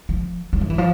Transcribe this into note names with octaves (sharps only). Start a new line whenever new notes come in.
F3
F#3
F3
E3
F3